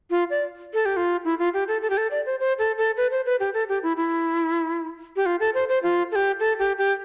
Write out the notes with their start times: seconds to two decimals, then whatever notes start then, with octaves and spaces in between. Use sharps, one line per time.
0.11 F4
0.30 D5
0.74 A4
0.86 G4
0.97 F4
1.25 E4
1.39 F4
1.54 G4
1.68 A4
1.82 A4
1.90 G4
1.97 A4
2.11 D5
2.26 C5
2.40 C5
2.59 A4
2.78 A4
2.97 B4
3.11 C5
3.26 B4
3.40 G4
3.54 A4
3.69 G4
3.83 E4
3.97 E4
5.16 G4
5.26 F4
5.40 A4
5.54 C5
5.69 C5
5.83 F4
6.12 A4
6.16 G4
6.40 A4
6.59 G4
6.78 G4